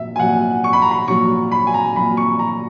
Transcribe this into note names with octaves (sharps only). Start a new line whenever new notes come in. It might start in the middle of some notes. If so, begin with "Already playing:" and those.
Already playing: A#2 F#3 E5
G#5
A#2 F#3 F#5
C#6
B5
A#5
B5
A#2 F#3 C#6
B5
G#5
A#5
A#2 F#3 B5
C#6
A#5